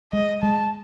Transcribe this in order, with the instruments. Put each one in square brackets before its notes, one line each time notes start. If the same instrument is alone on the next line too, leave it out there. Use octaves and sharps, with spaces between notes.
[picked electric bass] G#3 [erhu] D#5
[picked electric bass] G#3 [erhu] A5